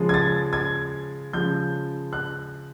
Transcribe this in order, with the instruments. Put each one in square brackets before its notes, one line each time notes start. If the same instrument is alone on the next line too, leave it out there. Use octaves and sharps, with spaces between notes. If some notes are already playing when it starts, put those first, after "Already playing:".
Already playing: [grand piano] C#3 F3 G#3
G#6
A6
G#6
C#3 F3 G#3 G6
F#6